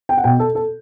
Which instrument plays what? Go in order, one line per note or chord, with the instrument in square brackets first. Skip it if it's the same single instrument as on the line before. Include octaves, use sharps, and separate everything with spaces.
[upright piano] G5
F#5
B2 G5
A4
A4